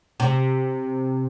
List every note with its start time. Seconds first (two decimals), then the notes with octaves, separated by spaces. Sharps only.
0.20 C3